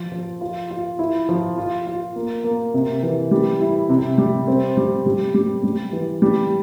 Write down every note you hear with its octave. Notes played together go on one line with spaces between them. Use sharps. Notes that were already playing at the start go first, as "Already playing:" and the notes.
Already playing: F3
F3
F4
F4
E4
F3
F4
F4
A#3
A#3
C3
E3
G3
E4
C3
G3
C4
G3
G3
G3
G3
E3
G3